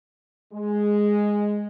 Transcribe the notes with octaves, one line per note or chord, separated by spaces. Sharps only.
G#3